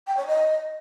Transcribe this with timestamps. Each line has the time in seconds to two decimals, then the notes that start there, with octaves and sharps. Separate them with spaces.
0.07 G5
0.17 C#5
0.27 D#5